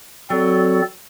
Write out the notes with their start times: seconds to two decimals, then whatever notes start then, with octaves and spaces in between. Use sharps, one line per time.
0.30 F#3 C4 A4 D5